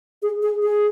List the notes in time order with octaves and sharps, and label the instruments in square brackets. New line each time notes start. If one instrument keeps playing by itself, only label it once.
[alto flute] G#4
G#4
G#4